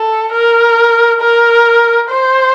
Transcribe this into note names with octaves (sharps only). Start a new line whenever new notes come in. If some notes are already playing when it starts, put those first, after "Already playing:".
Already playing: A4
A#4
A#4
C5